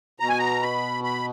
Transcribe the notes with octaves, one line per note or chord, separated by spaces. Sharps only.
B2 A#5
G#5
A#5
B5
B5